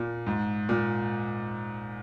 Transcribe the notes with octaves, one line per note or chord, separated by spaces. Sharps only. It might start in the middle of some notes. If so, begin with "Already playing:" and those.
Already playing: A#2
G#2
A#2